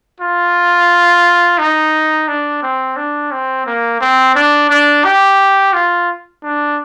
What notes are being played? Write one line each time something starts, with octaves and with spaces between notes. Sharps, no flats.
F4
D#4
D4
C4
D4
C4
A#3
C4
D4
D4
G4
F4
D4